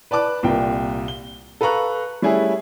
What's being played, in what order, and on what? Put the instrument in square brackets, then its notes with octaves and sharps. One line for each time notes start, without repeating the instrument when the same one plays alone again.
[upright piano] B4 D5 A5 D6 F#6
C2 A#2 G5
G7
A4 B4 F5 A#5 C#6 F#6
G3 A3 C#4 E4 G#4